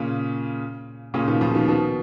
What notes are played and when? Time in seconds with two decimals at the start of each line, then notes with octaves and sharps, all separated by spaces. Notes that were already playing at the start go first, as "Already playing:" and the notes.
Already playing: A#2 C#3
1.14 A#2 C#3
1.27 B2 D#3
1.41 C#3 F3
1.55 B2 D#3
1.68 B2 D#3